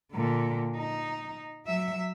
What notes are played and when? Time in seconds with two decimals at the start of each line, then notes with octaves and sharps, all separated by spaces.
0.12 A#2 D3
0.77 D#4
1.65 F#3 E5